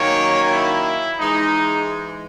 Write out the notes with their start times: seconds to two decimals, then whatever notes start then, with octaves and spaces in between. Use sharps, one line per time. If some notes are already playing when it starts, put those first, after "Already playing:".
Already playing: D#3 F#3 A#3 C#4 C#5
0.52 E4
1.19 G#2 E3 G#3 D#4